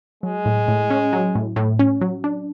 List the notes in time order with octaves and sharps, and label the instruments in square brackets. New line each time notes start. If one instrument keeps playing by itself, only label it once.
[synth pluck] F#3 [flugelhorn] G#3
[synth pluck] A2
A2
C#4
F#3
A2
A2
C#4
F#3
D4